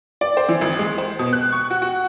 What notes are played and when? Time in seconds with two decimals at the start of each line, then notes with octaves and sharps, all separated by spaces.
0.21 D5
0.37 C5
0.49 E3
0.61 G#1
0.79 G#3
0.98 C5
1.19 B2
1.33 F#6
1.52 C#6
1.71 F#4
1.82 F#4